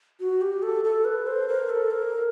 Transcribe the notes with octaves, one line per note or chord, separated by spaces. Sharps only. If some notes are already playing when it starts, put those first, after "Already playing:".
F#4
G4
A4
A4
B4
C5
A#4
A4
A#4